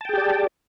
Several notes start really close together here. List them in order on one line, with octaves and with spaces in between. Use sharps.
A5 G5 G#4 G4 D5